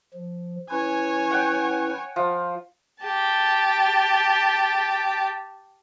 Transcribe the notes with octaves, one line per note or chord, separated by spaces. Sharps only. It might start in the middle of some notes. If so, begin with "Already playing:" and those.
F3
C#4 E4 B4 C#5 G#5
F#5 G5
F3
G4 A5